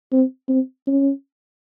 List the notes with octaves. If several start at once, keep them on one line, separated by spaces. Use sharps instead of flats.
C4
C4
C#4